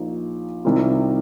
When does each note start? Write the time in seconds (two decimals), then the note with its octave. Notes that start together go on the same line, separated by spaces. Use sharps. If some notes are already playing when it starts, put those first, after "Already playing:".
Already playing: A#1 A#2 F3 D#4
0.65 C2 C3 D#3 C4 F4